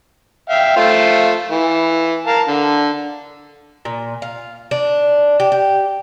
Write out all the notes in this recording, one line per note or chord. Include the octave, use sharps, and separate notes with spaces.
E5 F5 G5
A3 F4 C5
E3
A#4 F5 A5
D3
A#2
F4
D4
G4
G4